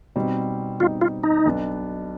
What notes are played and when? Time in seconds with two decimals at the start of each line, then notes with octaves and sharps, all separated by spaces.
0.16 B2 G3 C4 D#4
0.80 B2 G3 C4 D#4 F4
1.01 F4
1.23 D#4
1.45 B1 B2 B3 D4